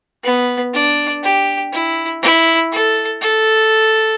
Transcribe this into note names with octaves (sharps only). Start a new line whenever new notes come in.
B3
D4
G4
E4
E4
A4
A4